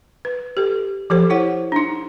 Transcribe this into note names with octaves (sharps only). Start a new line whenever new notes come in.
B4
G4 A4
F3 G4 A4 C5
E4 C5 C#5 F#5
D4 D#4